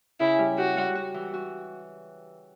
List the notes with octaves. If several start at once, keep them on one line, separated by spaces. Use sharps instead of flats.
C#3 E4
G3
F#4 G4
G3
F#4
E3
F#4